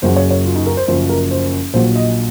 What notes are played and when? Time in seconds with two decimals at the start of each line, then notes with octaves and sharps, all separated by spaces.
0.02 F#1 F#2 C#3 F#3 C5
0.16 C#5
0.31 C#5
0.45 F4
0.55 D#4
0.66 A#4
0.77 C5
0.88 F#1 F#2 F3 C5
1.09 A#4
1.31 C5
1.74 A#1 A#2 F#3 C5
1.96 D#5